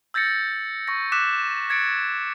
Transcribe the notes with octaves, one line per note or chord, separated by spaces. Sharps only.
E6 G6 A6 A#6 C#7
C#6 A#6
D6 E6 F#6 B6 E7
G#6 A6 C#7 D7